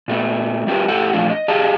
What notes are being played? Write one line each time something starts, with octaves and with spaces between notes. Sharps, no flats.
A#2 A3 B3
G3 F4 G4 A#4 B4
A2 G4 A4 F#5
A#2 F3 A3 D4 F4
D#5
G4 G#4 D#5 F5 A5 A#5